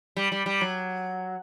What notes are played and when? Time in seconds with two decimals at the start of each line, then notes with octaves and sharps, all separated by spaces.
0.16 G3
0.32 G3
0.46 G3
0.61 F#3